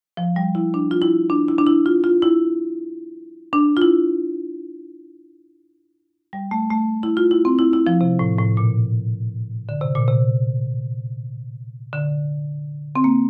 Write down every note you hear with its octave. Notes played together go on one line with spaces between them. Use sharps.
F3
G3
E4
D4
F4
E4
D4
E4
D4
E4
F4
F4
E4
D4
F4
E4
G3
A3
A3
E4
F4
E4
C4
E4
E4
F3
C3
A2
A2
A#2
D3
C3
A#2
C3
D3
C4
A#3